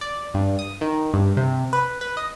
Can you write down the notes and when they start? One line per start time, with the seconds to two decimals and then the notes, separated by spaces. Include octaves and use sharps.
0.01 D5
0.34 G2
0.59 D#6
0.81 D#3
1.13 G2
1.37 C3
1.73 B4
2.01 B4
2.17 D#5